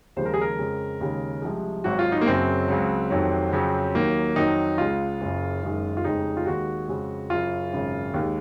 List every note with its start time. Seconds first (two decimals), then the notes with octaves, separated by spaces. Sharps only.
0.16 D#2 C#3 F3 G#3 C5
0.26 A#4
0.34 G#4
0.41 A#4
0.58 F2 C#3 G#3
1.00 D#2 C#3 G#3
1.42 C2 C3 F3 G#3
1.84 G#1 G#2 F#3 F#4
1.99 F4
2.12 D#4
2.21 A#3
2.26 F#1 F#2 C#3 F#3 C4
2.68 C#2 C#3 F#3
3.10 F1 F2 D#3 F#3
3.52 F2 C#3 F#3
3.95 D#2 D#3 F#3 A#3
4.36 F2 D#3 F#3 D#4
4.78 C#2 C#3 G#3 F4
5.21 F#1 F#2 C#3
5.62 F#1 F#2 D#3 G#3
5.97 F4
6.04 F1 F2 C#3 G#3 D#4
6.37 F4
6.46 D#2 D#3 G#3 F#4
6.88 F2 C#3 G#3
7.30 F#1 F#2 C#3 F4
7.73 G#1 F#2 C#3
8.14 D#2 D#3 G#3